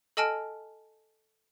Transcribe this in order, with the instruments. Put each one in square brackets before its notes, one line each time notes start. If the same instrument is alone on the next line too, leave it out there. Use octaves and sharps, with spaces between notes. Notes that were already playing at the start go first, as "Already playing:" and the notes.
[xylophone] A4 D#5 G#5 A5 F6 D7